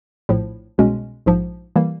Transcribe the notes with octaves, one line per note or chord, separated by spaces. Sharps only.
A#1 A2 F3
C2 B2 G#3 C#4
A#1 G#2 F3
E3 G3 A#3